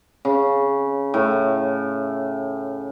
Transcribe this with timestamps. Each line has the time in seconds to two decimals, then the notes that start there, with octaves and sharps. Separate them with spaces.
0.25 C#3
1.14 A2